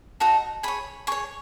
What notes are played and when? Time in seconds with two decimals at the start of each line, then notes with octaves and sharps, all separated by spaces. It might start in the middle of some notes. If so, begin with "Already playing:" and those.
0.20 D#4 F#4 A4 D#5
0.63 G#4 C#5 B5
1.07 G#4 C#5 C#6